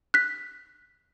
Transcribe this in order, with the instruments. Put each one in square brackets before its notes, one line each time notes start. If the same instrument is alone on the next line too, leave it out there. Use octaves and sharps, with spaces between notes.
[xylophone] F#6 B6